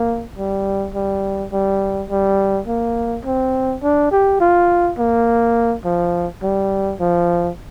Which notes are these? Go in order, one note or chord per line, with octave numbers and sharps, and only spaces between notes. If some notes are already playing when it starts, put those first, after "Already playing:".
Already playing: A#3
G3
G3
G3
G3
A#3
C4
D4
G4
F4
A#3
F3
G3
F3